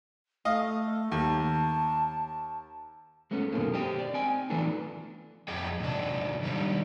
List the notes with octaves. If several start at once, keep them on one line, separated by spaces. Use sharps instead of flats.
A3 D#5 F5
D#2 A5
G#3 A3 B3 C#4
F#2 B2 D3 D#3 A#3
G4 C5 D#5 G5
D5
C4 G5 G#5
E3 F3 A3 B3 D4 D#4
F2 G#4 D#5 G5
G#2 C3 D4
D#3 G3 D4